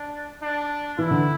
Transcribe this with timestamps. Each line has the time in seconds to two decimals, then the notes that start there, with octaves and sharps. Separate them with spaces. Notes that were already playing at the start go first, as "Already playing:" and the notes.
Already playing: D4
0.42 D4
0.98 E3 E4
1.11 D3